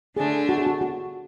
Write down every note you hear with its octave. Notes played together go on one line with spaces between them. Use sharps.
D3 A3 D4 G#4
F#4
G#4
F#4
F#4